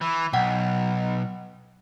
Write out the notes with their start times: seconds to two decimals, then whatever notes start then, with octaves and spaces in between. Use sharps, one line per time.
0.02 E3
0.33 B1 F#5 G5